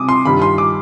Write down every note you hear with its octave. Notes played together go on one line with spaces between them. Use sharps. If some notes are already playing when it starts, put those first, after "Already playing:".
Already playing: C3 G3 D6 D#6
C6
G2 D#3 G3 B5
C6
D6